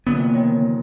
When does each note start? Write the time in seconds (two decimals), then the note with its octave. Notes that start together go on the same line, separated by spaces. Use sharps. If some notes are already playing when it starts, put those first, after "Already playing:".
0.07 F1 D3 A#3 B3
0.33 D#3 C#5